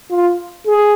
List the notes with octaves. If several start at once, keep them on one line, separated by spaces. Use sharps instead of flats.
F4
G#4